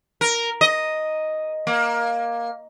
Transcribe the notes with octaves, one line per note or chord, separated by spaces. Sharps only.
A#4
D#5
A#3